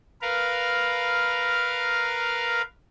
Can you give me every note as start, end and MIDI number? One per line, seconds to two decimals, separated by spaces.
0.22 2.62 70
0.22 2.62 71
0.22 2.62 77